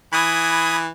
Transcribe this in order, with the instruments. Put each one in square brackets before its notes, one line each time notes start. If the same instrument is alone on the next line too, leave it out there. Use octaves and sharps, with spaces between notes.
[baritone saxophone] E3 [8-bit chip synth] B5 D#6 G#6